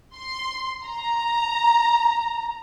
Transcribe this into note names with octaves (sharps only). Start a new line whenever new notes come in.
C6
A#5